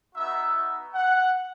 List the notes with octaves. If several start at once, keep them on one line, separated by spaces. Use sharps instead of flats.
B3 D#4 F#4 E5
F#5